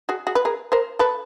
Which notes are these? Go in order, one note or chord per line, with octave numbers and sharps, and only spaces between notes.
F#4 G#4
F#4 G#4
B4
G#4 A#4
A#4 C5
A4 B4